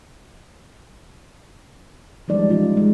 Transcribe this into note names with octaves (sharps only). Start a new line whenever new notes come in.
E3 F3 G3 G#3 D#4 D5
C#4 F4
G#3